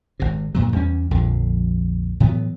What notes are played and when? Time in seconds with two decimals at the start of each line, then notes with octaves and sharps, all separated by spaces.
0.20 G#1 C3
0.55 G2 A#2 F#3
0.72 E2 G3 C#4
1.11 A#1 F2 D3
2.20 A2 E3 F#3 B3